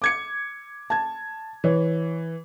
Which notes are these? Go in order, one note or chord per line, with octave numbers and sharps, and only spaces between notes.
D6 G#6 C#7
A5 G#6
E3 C#5